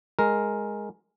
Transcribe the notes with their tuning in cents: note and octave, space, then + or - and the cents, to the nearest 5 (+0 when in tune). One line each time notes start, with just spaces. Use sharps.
G#3 +0 A#4 +0